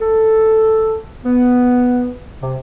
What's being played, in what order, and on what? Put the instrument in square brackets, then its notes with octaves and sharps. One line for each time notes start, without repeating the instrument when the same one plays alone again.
[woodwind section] A4
B3
C3